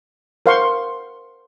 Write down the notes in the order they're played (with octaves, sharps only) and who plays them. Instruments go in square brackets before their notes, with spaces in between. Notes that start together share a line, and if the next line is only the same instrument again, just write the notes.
[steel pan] A#4 C5 F5 F#5 C6 C#6